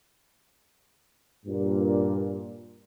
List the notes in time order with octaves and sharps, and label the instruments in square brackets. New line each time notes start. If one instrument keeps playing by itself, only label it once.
[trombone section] G2 A#2